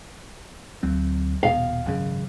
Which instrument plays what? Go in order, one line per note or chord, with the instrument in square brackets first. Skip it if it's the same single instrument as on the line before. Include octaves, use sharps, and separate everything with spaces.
[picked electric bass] D2 F#3 C4
[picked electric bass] D#1 B2 [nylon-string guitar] F5
[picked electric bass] G#1 F#2 C#3